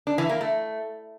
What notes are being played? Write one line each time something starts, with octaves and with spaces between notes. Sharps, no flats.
D4
E3
A#3
A3